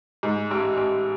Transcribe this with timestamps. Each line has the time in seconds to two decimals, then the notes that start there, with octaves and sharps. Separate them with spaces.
0.23 G#2
0.51 A1
0.77 A1